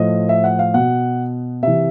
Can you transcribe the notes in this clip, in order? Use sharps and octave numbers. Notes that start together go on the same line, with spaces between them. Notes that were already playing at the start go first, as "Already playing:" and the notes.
Already playing: A2 F3 D#5
E5
F#5
F5
B2 F#5
C3 E3 E5